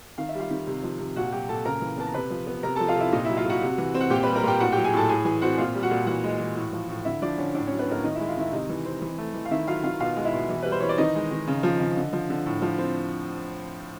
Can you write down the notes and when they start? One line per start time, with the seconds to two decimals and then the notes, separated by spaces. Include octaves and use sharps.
0.18 D#3 F5
0.29 E5
0.35 G3 F4 F5
0.50 D#3
0.67 C3
0.83 F3
1.00 C3
1.16 A#2 F#4 F#5
1.32 F#3 G4 G5
1.49 A#2 A4 A5
1.65 C#3 A#4 A#5
1.81 E3
1.98 B3 A5
2.07 A#5
2.14 C3 B4 B5
2.30 F3
2.47 B3
2.63 C3 A#4 A#5
2.76 A4 A5
2.80 F3
2.88 F4 F5
2.96 C3 E4 E5
3.12 A#2 D#4 D#5
3.25 E4 E5
3.29 F#3
3.37 F4 F5
3.45 A#2 F#4 F#5
3.62 C3
3.78 E3
3.95 C4
4.00 F#5
4.10 A#2 G4 G5
4.23 G3 B4 B5
4.35 A#4 A#5
4.43 A#2 G4 G5
4.60 A2 F#4 F#5
4.72 G4 G5
4.76 F#3
4.84 G#4 G#5
4.93 A2 A4 A5
5.09 A2 G#4 G#5
5.25 E3 G#4 G#5
5.42 C4 F#4 F#5
5.58 A#2 F4 F5
5.74 G3
5.83 F#4 F#5
5.91 A#2
6.07 E3 F#4 F#5
6.24 G#3
6.40 E3
6.56 A2
6.73 F3
6.89 A2
7.05 D3 E4 E5
7.22 F3 D4 D5
7.38 D3 C#4 C#5
7.54 A2 D4 D5
7.66 F#3 C#4 C#5
7.79 B3 B4
7.87 A2 A#3 A#4
8.04 D#3 D#4 D#5
8.15 G#3 E4 E5
8.28 F4 F5
8.37 D#3 E4 E5
8.52 C3 D#4 D#5
8.69 E3
8.85 C4
9.02 E3
9.18 A3
9.34 E3
9.45 F5
9.51 D#3 E4 E5
9.67 F#3 F4 F5
9.83 D#3 F4 F5
10.00 B2 F4 F5
10.16 G#3
10.24 E4 E5
10.33 B2
10.49 E3
10.63 G3 B4
10.72 C5
10.80 E3 C#5
10.89 D5
10.98 D#3 D#4 D#5
11.15 G#3
11.31 D#3
11.47 C#3
11.63 F3
11.80 C#3
11.97 D3
12.13 F3
12.29 D3
12.46 A2
12.62 F3
12.78 C4